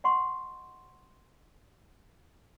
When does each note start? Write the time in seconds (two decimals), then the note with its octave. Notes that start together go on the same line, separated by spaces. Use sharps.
0.04 D#5 F#5 C6 C#6